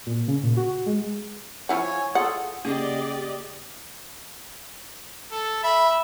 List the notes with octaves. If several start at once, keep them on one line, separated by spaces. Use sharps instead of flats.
A#2
C#3
A#2
F#4
G#3
F3 E4 C#5 F#5 G#5
F4 G#4 A4 F#5
C#3 A#3 G4 G#4 D5 D#5
A4
E5 B5